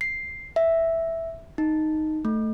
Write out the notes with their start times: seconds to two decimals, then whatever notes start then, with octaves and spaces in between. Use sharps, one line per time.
0.01 C7
0.56 E5
1.58 D#4
2.25 A3